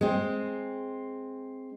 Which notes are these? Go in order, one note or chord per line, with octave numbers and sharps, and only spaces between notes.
G#3 C4